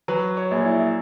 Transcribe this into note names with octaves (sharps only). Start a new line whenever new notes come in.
F#3 B4
C#5
A#1
E4